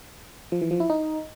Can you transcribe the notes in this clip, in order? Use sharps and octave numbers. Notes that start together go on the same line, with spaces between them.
F3
E3
F3
E4
D#4